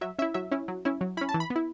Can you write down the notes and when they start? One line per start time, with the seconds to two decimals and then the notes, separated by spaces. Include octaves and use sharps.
0.01 F#3 E5
0.19 C#4 E4 E5
0.34 F#3 E5
0.51 C#4 E4
0.68 F#3
0.85 C#4 E4
1.01 F#3
1.17 C#4 E4 B5
1.29 A5
1.34 E3
1.40 B5
1.50 B3
1.56 E4